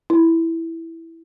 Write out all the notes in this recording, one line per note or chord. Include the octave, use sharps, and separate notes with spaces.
E4